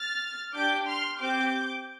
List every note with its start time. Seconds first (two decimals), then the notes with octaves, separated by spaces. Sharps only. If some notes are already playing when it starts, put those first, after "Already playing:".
Already playing: F6 A6
0.54 D4 G4 D6 G6
0.87 C6 F6
1.19 C4 G4 D6 G6